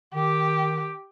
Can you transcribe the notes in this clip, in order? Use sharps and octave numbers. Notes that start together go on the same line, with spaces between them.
D#3 G4